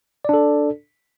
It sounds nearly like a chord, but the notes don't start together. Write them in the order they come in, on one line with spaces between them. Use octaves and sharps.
D5 D4 A4